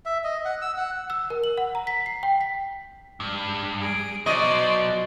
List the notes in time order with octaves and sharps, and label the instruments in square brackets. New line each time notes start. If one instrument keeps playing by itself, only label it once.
[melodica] E5
D#5
F#5
E6
F#5
[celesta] E6
A#4
F#7
F#5
A#5
B6
C7
G5
B6
[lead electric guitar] G2
[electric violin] G#4 D7
[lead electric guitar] B2 F#3 [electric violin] C5 D5 [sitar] D#5